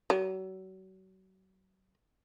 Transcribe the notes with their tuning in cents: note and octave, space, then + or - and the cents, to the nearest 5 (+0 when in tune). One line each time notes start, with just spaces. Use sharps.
F#3 +35